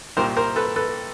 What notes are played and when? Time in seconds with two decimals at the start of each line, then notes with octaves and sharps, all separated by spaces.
0.17 C2 A#2 G3 A#4 C5
0.36 A#4 C5
0.56 A4 B4
0.76 A4 B4